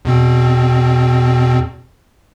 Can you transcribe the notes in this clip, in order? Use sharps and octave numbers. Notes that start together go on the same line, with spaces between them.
E2 B2 C4